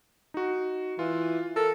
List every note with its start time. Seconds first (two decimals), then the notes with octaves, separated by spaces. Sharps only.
0.34 D#4 F#4
0.99 E3 F4
1.56 A4 A#4